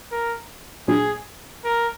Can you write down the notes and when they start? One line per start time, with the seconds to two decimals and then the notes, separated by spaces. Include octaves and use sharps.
0.12 A#4
0.88 A#2 F#3 D4 G#4
1.64 A#4